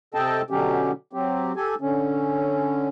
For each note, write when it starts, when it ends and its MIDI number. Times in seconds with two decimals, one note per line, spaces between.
0.14 0.41 48
0.14 0.41 69
0.14 0.41 75
0.14 0.41 79
0.14 0.41 81
0.50 0.92 47
0.50 0.92 50
0.50 0.92 54
0.50 0.92 61
0.50 0.92 67
1.13 1.52 54
1.13 1.52 60
1.13 1.52 67
1.56 1.75 67
1.56 1.75 69
1.56 1.75 80
1.81 2.89 50
1.81 2.89 61